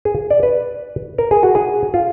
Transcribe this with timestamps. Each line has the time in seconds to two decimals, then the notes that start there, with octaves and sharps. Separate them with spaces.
0.05 G#4
0.30 D5
0.43 B4
1.18 A#4
1.31 G#4
1.43 F#4
1.55 G#4
1.94 F4